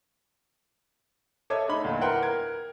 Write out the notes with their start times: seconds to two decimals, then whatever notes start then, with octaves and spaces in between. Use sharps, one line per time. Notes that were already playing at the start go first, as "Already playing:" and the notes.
1.50 A4 C#5 D#5 E5 D6 G#6
1.68 A3 D#4 B5
1.84 E2 A#2 D3
2.01 E4 A#4 B4 F#5 G5 C6
2.22 A#4 G#6